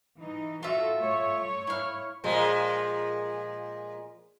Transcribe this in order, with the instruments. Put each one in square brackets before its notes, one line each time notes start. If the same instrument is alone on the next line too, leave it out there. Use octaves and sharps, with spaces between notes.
[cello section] E3 D#4
[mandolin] F4 E5 [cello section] F#4 A4
[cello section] A3 C#5
[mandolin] E4 F5
[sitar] A#2 F3 G#3